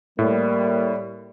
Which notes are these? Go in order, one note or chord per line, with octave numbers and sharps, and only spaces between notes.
A2 G3 A#3